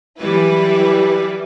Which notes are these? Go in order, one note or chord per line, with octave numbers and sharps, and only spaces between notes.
E3 F#3 G3 E4 B4